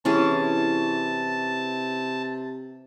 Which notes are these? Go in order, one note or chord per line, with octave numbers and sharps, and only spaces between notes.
C3 E3 C#4 G#4 A5